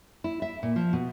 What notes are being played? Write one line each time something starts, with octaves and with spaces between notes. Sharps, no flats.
E4
E5
A#2
F3
B2